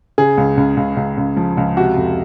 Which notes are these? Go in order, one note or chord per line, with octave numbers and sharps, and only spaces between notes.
C#3 G#4
C#2
C#2
C#2
C#2
C#2
F3
C#2
C3 F#4
F2